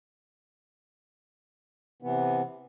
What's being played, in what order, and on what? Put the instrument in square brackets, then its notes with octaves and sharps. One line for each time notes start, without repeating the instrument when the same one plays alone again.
[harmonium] C3 E3 B3